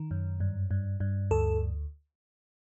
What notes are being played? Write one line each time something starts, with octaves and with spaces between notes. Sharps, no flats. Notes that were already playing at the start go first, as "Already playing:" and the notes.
Already playing: D#3
F#2
G2
G2
G2
D2 A4